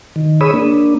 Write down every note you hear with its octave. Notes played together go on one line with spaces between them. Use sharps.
D#3
G#4 C#5 B5 D#6 E6
A#3 D4